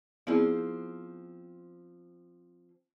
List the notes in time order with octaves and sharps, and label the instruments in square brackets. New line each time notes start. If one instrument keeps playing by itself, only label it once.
[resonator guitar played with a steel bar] F3 C4 [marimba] B3 E4 G#4